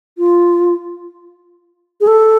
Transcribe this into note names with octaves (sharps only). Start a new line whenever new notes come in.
F4
G#4
A4